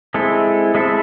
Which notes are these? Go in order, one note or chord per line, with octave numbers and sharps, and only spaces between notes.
G#3 C4 E4 A4
G#3 C4 E4 A4